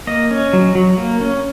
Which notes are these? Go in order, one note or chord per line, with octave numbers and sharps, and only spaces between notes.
A#3 D#5
C#4
F#3
F#3
A#3
C#4